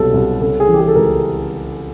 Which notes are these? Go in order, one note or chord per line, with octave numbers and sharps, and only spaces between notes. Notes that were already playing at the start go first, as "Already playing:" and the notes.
Already playing: C2 B2 F#3 A4
C2
C#3 A4
G#4
E3
G4
G#4
A4
C#2 A#4